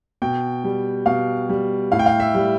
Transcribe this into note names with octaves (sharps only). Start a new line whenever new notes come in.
B2 G5
G3
B2 F5
G3
A2 F5
G5
F5
E5
G3